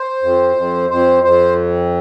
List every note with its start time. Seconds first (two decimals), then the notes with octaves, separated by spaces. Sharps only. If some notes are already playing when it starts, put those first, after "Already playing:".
Already playing: C5
0.23 F2
0.56 F2
0.90 F2 C5
1.23 F2 C5